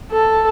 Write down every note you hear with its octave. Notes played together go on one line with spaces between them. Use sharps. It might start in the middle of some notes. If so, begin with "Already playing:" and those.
A4